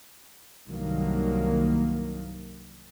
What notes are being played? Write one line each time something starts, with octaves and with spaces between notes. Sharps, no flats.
C2 G2 D#3 F#3 A#3